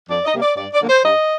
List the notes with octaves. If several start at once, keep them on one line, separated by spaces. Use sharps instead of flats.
F2 D5
D#5
C3 G3 A#3
D5
G2 D5
D5
D3 F3 A#3
C5
G2 D#5